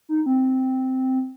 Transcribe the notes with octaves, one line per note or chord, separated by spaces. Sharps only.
D#4
C4